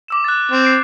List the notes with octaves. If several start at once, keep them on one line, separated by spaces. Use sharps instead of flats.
D6 E6 E7
F#6 A6
C4
C7 D7